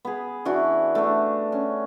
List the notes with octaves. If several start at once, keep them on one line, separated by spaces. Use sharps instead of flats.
B3 G#4
E3 D4 F#4
A3 D4
C#4